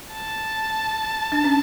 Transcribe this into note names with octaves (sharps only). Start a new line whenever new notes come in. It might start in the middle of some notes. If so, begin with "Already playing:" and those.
A5
D4
C#4